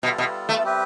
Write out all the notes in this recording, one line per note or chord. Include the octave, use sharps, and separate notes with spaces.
B2 G3 B3 F4 A4
B2
A3
G3 C4 G4 B4